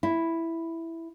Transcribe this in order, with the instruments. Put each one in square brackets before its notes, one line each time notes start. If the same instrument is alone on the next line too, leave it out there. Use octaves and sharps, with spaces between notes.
[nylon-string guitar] E4